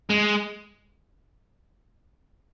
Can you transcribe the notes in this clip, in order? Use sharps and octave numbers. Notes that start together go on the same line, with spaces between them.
G#3